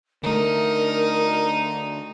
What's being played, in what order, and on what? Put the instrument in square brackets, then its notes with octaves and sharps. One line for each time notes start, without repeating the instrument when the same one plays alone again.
[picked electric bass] D3 A3 [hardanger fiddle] D#4 [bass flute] A#4